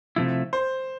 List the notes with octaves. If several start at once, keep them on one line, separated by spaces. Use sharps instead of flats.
C3 F3 A3 E4
C5